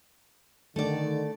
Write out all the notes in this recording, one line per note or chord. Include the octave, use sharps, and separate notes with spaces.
D3 D#3 A3 D5